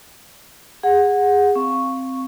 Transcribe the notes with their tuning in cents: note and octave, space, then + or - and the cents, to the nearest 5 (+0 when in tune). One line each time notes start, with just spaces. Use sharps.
G#4 -20 F#5 -15
C4 +0 F5 +0 C#6 +0